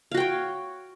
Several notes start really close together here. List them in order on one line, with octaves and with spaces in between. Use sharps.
F5 F#4 G5 C#5